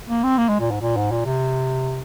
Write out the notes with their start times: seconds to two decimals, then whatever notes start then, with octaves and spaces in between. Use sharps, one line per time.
0.09 A#3
0.24 C4
0.38 A#3
0.49 G#3
0.60 A#2
0.71 G#2
0.81 A#2
0.97 G#2
1.12 A#2
1.25 C3